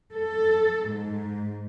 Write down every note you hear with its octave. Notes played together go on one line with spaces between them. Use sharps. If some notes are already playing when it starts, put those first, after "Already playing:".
A4
G#2